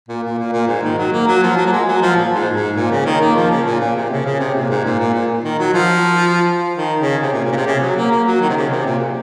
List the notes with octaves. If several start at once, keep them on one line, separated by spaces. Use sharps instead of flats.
A#2
A#2
A#2
A#2
G#2
D#3
F#3
A#3
F#3
F3
F#3
A#3
G#3
F#3
F3
A#2
G#2
G#2
A#2
C#3
D#3
A#3
F3
C#3
A#2
A#2
C3
C#3
C#3
C3
A#2
G#2
A#2
A#2
A#2
D#3
F#3
F3
D#3
C#3
C3
A#2
A#2
C#3
C3
C#3
F#3
A#3
A#3
F#3
D#3
C3
C#3
C3
A#2